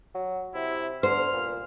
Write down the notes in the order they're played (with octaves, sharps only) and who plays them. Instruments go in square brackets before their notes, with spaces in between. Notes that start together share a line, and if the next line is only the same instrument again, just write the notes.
[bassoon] F#3
[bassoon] C3 [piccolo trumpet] E4
[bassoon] D3 [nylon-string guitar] C5 [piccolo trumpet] F6
[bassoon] A#2